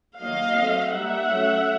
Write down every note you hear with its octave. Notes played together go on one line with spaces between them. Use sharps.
D#3 F#3 A#3 D#5 F5
F#3 A3 C4
G3 A#3 D#4 E5 F#5
F#3 A3 C#4